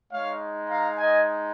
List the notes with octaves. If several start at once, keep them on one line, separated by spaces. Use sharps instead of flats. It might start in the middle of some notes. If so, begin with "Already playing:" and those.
G#3 D#4 C#5 F5
F5 A#5
D#5 G#5